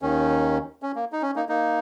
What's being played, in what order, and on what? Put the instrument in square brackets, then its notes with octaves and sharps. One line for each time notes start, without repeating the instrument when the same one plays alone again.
[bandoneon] D#2 D#3 C#4
C#4
A#3
D#4
C#4
A#3 D#4
A#3 D#4